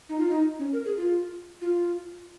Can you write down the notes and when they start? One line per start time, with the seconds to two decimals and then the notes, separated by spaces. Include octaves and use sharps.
0.09 D#4
0.19 F4
0.30 D#4
0.59 C#4
0.73 A#4
0.85 G#4
0.97 F4
1.61 F4